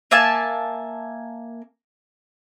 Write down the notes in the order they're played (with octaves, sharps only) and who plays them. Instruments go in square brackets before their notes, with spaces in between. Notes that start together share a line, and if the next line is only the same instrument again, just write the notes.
[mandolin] A#3 E5 G#5 A5